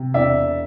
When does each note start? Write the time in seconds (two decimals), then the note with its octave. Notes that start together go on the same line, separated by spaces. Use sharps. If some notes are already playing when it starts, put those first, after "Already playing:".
Already playing: C3
0.14 E1 D5 E5